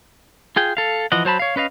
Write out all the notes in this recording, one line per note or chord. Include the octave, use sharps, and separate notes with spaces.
F4 G#4 G5
A4 F5
E3 F3 D#5 F#5
F#3 C5 A5 B5
C#5 F5
C#4 B4 D#5 F5